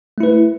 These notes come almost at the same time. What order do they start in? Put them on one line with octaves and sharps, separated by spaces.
A3 E4 B4